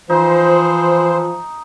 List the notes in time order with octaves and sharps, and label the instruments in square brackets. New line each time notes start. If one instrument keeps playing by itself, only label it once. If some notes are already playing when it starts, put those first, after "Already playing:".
[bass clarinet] E3 [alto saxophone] F3 [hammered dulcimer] D#4 [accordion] C5